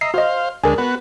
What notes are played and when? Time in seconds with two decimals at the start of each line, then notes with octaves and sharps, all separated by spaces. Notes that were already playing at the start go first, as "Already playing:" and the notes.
0.01 D#5 E5 A#5 C7
0.14 F#4 C5 D#5 F5
0.64 D2 G#3 D4 A#4 G#5
0.78 B3 F#4 B4